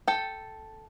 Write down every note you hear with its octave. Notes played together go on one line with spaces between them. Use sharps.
A4 G5